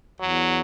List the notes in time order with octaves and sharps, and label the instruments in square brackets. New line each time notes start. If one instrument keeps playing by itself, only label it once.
[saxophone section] E2 [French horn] F#3